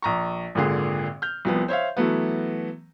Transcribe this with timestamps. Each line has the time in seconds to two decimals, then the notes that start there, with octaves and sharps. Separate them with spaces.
0.02 A#1 A#5 C#6
0.55 G#1 A#2 D3 G#4
1.22 F6 G6
1.45 C2 F3 B3
1.68 C5 C#5 E5 F5
1.97 E3 F#3 A3 B3